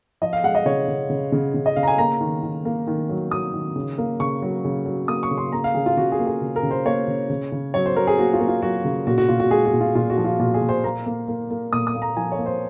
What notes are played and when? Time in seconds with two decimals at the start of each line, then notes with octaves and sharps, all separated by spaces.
0.22 F3 D#5
0.33 F5
0.44 G#3 F#5
0.55 D#5
0.65 C#3 C#5
0.88 C#3
1.10 C#3
1.32 C#3
1.54 C#3
1.66 D#5
1.76 C#3 F5
1.83 A#5
1.88 G#5
1.98 A#3 A#5
2.21 D#3
2.43 D#3
2.65 A#3
2.87 D#3
3.09 F#3
3.31 F#3 D#6
3.54 D#3
3.76 C#3
3.98 A#3
4.20 C#3 C#6
4.42 F#3
4.65 C#3
4.86 F#3
5.08 A#3 D#6
5.23 C#6
5.31 C#3
5.38 C6
5.52 A#3 A#5
5.64 F5
5.74 C#3 G#4
5.86 F4
5.97 C#3 F#4
6.12 G#4
6.19 A#3
6.27 G#4
6.41 C#3
6.56 A#4
6.63 C#3
6.71 C5
6.85 A#3 C#5
7.08 C#3
7.30 C#3
7.52 C#3
7.74 F#3 C#5
7.86 C5
7.96 F#3 A#4
8.07 G#4
8.18 A#3 F#4
8.33 F4
8.40 A#3
8.48 F4
8.62 F#3 F#4
8.85 C#3
9.07 A#2 F#4
9.18 F#4
9.28 A#2 F4
9.40 F#4
9.51 G#3 G#4
9.66 F#4
9.73 A#2
9.81 F4
9.95 A#2 F4
10.10 F#4
10.17 F3
10.24 F4
10.40 A#2 F#4
10.54 G#4
10.61 A#2
10.69 C5
10.84 A#3 A#5
11.06 A#3
11.28 A#3
11.50 A#3
11.73 A#2 D#6
11.87 D#6
11.95 A#3
12.02 A#5
12.17 F3 G#5
12.32 C#5
12.38 A#3
12.46 C5